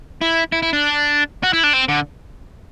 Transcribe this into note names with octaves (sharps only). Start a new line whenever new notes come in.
E4
E4
E4
D4
F#4
E4
D4
C4
D3